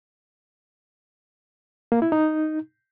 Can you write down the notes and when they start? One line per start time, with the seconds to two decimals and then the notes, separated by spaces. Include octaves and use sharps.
1.92 A#3
2.02 E4
2.12 D#4